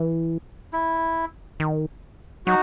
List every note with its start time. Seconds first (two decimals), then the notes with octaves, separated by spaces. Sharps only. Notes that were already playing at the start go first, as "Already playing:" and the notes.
Already playing: E3
0.73 E4
1.60 D#3
2.46 F#3 D#4 F#4